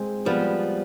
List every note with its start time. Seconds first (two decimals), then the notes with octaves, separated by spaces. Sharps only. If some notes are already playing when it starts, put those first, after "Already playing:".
Already playing: G#3 C4
0.26 F3 G3 B3